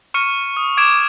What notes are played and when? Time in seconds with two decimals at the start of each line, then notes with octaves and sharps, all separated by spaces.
0.14 C#6 F6 C#7 D#7
0.57 D#6
0.77 D6 G#6 D7 E7